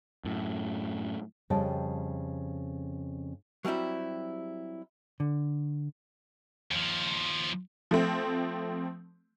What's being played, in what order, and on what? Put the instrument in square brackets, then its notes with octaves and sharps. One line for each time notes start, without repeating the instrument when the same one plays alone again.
[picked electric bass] F#2 A2
[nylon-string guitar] F2 C#3 G3 D#5 G5 A5
[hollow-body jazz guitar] F#3 G3 C4 E4 G4
D3
[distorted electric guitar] D#2 F3
[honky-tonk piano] F3 A3 C4